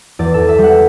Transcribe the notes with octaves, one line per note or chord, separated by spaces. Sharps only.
E2 D5
E2 A4
E5
G3 F#5